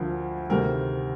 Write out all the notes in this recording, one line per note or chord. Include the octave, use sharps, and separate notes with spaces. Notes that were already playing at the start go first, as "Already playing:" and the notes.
Already playing: D2 D3 F3 A#4
D2 C3 D#3 A#4